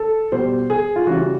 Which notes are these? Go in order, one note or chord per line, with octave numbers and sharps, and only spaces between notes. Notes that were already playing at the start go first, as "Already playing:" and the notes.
Already playing: A4
B2 G3 C5
G#4
F4
C#3 E3 G3 F#4